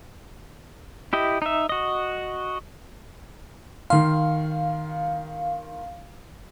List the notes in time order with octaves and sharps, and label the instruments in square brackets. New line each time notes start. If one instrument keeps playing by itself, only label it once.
[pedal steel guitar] E4 G4 D#5
D#4 E5
F#4 D#5
[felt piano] D#3 C6 [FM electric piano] F5